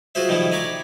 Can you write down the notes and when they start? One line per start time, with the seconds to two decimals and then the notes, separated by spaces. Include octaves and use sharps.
0.15 F4 F#4 G#4 C5 E5
0.29 D#3 F3 G3 A3 E4
0.52 G#5 A#5 B5 C#6 D6